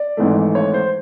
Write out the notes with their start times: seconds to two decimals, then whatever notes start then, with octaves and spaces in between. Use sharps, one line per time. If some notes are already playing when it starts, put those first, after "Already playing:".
Already playing: D5
0.17 G#1 G#2 E3 A3
0.55 C#5
0.74 C5